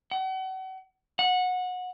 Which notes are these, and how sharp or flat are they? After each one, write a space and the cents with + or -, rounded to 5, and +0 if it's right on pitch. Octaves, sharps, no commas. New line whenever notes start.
F#5 +40
F#5 -20